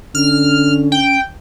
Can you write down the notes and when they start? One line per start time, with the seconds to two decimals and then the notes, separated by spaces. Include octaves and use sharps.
0.15 D3 C#4 F6
0.92 G5